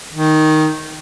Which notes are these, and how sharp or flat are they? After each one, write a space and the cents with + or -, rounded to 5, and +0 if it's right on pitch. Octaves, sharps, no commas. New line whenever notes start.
D#3 +0